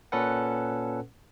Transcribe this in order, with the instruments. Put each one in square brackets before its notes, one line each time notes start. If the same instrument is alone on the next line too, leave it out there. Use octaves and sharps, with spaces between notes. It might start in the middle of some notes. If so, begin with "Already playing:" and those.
[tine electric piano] A#2 C#4 A4 B4 F#5